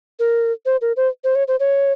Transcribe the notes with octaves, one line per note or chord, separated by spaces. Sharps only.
A#4
C5
A#4
C5
C5
C#5
C5
C#5